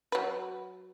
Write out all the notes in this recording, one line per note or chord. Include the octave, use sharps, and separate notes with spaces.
F#3 B4